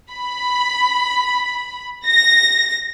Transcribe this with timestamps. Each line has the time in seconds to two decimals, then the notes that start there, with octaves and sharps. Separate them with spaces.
0.12 B5
2.06 A#6